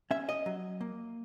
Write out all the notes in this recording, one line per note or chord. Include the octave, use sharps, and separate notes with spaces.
C#4 E5
D#5
F#3
A#3